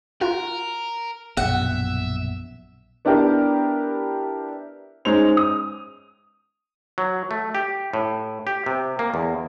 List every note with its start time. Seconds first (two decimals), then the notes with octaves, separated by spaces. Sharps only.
0.21 F4 F#4 A#4
1.37 A#1 F#2 B2 E5 F#5
3.05 B3 D4 E4 G4 A#4
5.05 G#3 C#4 D#4 C5 F7
5.37 D#6
6.98 F#3
7.31 A3
7.55 G4
7.93 A2
8.47 G4
8.66 C3
8.99 A#3
9.14 E2